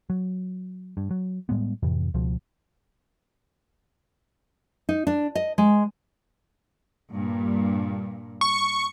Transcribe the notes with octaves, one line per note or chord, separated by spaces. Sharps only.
F#3
G2
F#3
A2 G3 G#3 B3
F2 A2 C3 E3
C#2 B2 F3
D#4
D4
D#5
G#3
G2 A#2
C#6